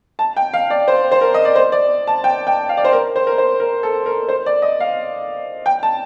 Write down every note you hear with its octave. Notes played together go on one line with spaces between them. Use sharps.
A5
G5
F5
D5
C5
C5
A#4
D#5
D5
C5
D5
A5
G5
G5
F5
D5
C5
A#4
C5
A#4
C5
A#4
A4
A#4
C5
D5
D#5
F5
G5
A5